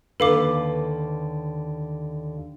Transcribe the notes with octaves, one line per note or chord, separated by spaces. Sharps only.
D#2 D3 A4 B4 F5 D6